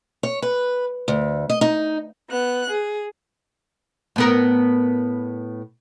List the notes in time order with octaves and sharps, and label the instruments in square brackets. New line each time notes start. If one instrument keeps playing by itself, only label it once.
[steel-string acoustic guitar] C#5
B4
D2
D#5
D#4
[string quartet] B3 F#6
G#4
[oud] A2 B3 A#4